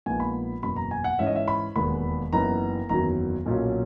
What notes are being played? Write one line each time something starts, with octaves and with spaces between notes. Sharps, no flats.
A#1 A#2 G#3 B3 D#4 G#5
B5
F#1 E2 B2 B5
A#5
G#5
F#5
G#2 E3 G#3 C#4 E5
D#5
E5
B5
E1 D#2 D#3 G#3 B3 B5
F#1 F#2 E3 B3 D#4 A#5
F#1 E2 D#3 F#3 A#5
B1 A#2 F#3 C#4